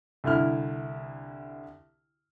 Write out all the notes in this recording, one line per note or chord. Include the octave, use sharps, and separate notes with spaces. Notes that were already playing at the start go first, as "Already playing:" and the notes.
C2 D3 E4 F6